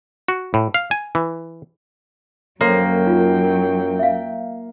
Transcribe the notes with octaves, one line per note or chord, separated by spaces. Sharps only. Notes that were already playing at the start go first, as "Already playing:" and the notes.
F#4
A2
F5
G#5
E3
F#2 F#3 A#3 A4 C#5 G5 C6
D#4 F4
E5 F5